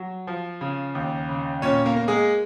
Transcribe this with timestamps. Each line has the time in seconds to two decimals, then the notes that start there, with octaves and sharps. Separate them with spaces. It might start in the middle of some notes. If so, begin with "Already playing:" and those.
Already playing: F#3
0.27 F3
0.61 C#3
0.95 D#2
1.29 C#3
1.62 A#2 C#4 C#5
1.86 A#3 A#4
1.96 A#3
2.08 G#3 G#4